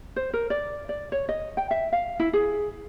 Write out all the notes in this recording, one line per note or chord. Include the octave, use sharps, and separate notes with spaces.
C5
A#4
D5
D5
C#5
D#5
G5
E5
F5
E4
G#4